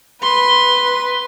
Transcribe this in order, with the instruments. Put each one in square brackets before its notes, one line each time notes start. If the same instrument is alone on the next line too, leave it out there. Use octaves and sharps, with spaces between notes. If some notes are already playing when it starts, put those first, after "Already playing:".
[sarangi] B4 [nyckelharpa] C6